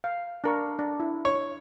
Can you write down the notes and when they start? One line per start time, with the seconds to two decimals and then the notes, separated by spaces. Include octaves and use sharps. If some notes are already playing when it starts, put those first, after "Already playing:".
0.04 F5
0.44 D4 A#4 C#6
0.79 D4
1.00 E4
1.25 C#5